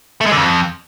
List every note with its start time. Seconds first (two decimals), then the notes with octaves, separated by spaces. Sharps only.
0.21 A3
0.26 G#3
0.32 D3
0.37 F2